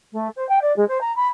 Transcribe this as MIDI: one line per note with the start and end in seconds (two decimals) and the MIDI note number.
0.12 0.28 57
0.36 0.47 72
0.49 0.59 79
0.61 0.74 74
0.76 0.86 56
0.88 1.00 72
1.01 1.14 82
1.16 1.27 83